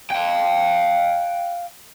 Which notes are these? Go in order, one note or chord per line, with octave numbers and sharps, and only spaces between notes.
F5 G5